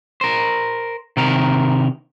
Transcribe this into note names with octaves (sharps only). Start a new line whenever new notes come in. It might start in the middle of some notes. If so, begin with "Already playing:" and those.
A#4 C5
C3 D#3 A#4